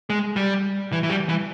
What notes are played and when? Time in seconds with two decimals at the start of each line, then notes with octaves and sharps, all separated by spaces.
0.10 G#3
0.36 G3
0.92 E3
1.03 E3
1.10 G3
1.29 E3